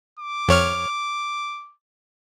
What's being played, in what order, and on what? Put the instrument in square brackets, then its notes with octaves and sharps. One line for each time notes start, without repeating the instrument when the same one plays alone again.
[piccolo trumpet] D6
[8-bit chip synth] F2 C#5 F6